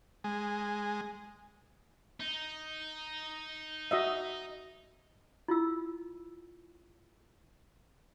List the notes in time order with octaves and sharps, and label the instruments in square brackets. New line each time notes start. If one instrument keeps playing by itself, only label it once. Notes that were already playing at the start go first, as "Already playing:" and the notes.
[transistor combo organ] G#3
[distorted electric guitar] D#4
[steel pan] F#4 D#5 E5
[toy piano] E4 F4 E6